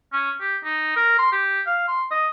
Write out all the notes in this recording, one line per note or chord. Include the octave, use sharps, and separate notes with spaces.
C#4
G4
D#4
A#4
C6
G4
F5
C6
D#5